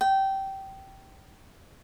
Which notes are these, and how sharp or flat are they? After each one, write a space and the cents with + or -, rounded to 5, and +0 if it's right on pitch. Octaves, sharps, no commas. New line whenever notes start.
G5 -20